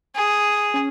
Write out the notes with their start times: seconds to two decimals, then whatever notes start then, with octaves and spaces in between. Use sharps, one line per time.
0.16 G#4
0.74 C#4